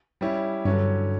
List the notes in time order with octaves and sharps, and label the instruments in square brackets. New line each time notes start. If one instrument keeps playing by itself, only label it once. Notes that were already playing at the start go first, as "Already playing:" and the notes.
[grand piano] G3 C#4 E4 G4
[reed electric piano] G2 [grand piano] D3 F#3 C#4